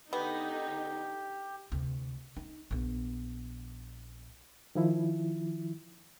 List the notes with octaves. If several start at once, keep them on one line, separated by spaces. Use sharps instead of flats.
D3 B3 D#4 G4
D2 C3
D#4
A#1 B3
D#3 F3 E4